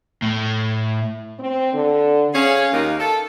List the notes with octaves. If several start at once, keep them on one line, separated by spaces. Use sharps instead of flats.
A2
C4
D3
C#4 G#4 F5
D#2 A#3 D#4
A4